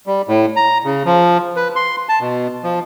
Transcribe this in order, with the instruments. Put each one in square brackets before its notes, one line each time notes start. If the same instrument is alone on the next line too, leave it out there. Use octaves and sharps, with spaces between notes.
[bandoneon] G3
A2
A#5
C#3
F3
B4
C6
A5
B2
F3